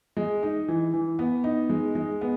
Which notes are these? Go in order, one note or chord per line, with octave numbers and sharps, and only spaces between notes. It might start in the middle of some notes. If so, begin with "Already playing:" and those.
G#3
D#4
E3
E3
B3
D#4
G#3
G#3
B3